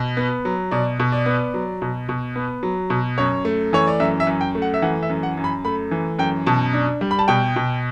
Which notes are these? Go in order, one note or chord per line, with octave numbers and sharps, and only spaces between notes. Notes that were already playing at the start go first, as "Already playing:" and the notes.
Already playing: B2
B3
F#3
B2 D5
B2
D5
B3
F#3
B2
B2
B3
F#3
B2
F#2 C#5
A3
E3 C#5
D5
F#2 E5
E5
F#2
G5
A3
F#5
E5
E3 F#5
E5
F#2
F#5
F#2
B5
A3 B5
E3
F#2 G5
B2 A5
D4
G3
B5
A5
B2 G5
B2